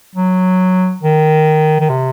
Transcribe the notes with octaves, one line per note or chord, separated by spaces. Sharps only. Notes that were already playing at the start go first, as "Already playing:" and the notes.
F#3
D#3
D#3
C3